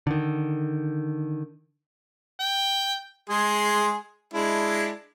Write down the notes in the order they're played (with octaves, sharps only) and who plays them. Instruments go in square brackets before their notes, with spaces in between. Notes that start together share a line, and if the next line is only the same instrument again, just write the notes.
[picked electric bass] D3 D#3
[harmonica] G5
G#3 G#4 C6
G#3 D4 E4